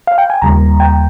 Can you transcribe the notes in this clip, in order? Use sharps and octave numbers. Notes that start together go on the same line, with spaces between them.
F5
G5
G#5
D#2 C#3 G3 A#3 A#5
G5